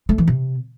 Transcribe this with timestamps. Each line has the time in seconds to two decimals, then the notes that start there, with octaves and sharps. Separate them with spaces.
0.09 A3
0.18 E3
0.28 C3